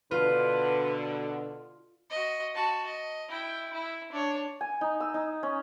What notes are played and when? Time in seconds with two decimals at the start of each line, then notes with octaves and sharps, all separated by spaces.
0.11 B2 D3 F4 B4
2.10 F#4 D#5
2.55 F#4 A5
2.86 D#5
3.28 E4 G5
3.73 E4
4.12 D4 C#5
4.61 G#5
4.81 D#4
5.00 E6
5.14 D#4
5.43 C#4